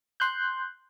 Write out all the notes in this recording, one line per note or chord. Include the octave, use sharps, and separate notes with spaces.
C6 F#6 G6